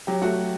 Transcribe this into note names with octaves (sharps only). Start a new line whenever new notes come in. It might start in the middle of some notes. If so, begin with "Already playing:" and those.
F#3 G4
A3 F#4